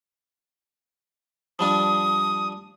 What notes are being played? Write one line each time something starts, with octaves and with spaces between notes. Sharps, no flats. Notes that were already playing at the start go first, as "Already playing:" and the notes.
F3 G3 D4 D#6